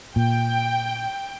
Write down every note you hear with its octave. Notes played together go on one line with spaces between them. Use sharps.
A#2 G5